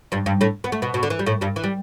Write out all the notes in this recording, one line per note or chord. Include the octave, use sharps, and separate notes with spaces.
G2 G3
G2 G3
A2 A3
B3
A3
B2 B3
B2
D3
E3
G3
A2 A3
G2 G3
E3
G3